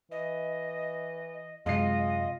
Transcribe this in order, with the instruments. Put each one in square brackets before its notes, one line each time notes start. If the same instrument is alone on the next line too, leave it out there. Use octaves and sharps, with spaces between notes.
[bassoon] E3 [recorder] D#5
[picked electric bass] F#2 C3 [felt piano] G#3 C7 [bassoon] F4 [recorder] D#5